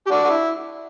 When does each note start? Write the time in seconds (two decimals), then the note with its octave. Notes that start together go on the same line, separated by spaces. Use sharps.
0.07 G4
0.11 D4 F#4
0.24 F#4
0.30 E4